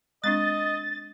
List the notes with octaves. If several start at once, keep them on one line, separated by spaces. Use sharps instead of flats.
G#3 C4 D4 D#5 A6